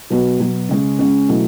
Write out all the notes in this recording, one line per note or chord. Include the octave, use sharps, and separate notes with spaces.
B2 F#3 B3 F#4
B2 F#3 B3 F#4
C#3 G#3 C#4
C#3 G#3 C#4
B2 F#3 A3 E4